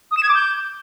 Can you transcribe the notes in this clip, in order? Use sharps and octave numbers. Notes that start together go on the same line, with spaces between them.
D#6
E7
G#6
D6
G6